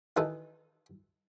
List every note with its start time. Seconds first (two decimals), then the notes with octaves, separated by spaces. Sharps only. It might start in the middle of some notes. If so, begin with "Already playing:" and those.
0.17 D#3 E3 D#4 A4